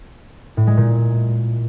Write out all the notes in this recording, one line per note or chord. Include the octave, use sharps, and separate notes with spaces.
A2
G#3
A#2